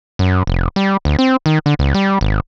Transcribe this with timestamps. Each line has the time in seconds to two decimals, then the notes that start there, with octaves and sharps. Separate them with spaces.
0.19 F#2
0.47 F1
0.76 G3
1.05 D2
1.19 C4
1.46 D#3
1.66 D3
1.79 C#2
1.94 G3
2.21 G#1